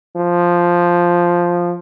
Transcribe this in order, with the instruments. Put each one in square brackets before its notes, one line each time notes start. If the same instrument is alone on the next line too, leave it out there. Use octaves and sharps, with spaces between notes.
[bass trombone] F3